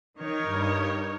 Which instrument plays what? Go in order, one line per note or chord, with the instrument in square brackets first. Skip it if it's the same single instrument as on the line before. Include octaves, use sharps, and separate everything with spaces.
[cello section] D#3 [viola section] D#4 A#4 C#5
[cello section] G2